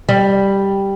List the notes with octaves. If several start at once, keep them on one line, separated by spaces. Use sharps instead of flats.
G3